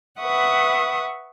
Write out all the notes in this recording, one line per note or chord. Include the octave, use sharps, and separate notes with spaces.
B4 E5 F#5 C#6 D#6 F#6